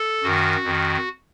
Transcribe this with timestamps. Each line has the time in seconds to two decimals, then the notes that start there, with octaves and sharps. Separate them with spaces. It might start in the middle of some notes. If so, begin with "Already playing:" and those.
Already playing: A4
0.23 F#2 D#3 F#4
0.64 F2 D#3